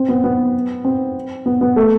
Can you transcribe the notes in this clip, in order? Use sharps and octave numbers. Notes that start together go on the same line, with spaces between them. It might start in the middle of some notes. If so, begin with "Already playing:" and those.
Already playing: C4
B3
B3
C4
B3
B3
A3